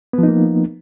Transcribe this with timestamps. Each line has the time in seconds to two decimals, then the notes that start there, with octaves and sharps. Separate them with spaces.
0.13 B3
0.18 F3
0.23 D#4
0.28 A#3